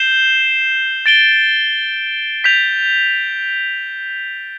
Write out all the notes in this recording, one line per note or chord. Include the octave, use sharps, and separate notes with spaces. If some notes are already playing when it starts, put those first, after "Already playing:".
Already playing: G6 C7 E7 G7
A6 D7 G7
G6 B6 F7